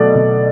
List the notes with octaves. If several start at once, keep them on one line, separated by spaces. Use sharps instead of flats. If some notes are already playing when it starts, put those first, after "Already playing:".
Already playing: B2 F#3 A3 D5
B2